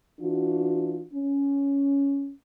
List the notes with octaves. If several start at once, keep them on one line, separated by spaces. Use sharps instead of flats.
E3 D4 F4 F#4
C#4